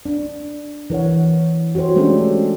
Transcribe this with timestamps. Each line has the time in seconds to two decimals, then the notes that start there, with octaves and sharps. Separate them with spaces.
0.06 D4
0.90 E3 A#4 C#5 F#5
1.75 F#4 G4 A4 C5 C#5
1.95 G#3 A3 C#4 D4 G4 A4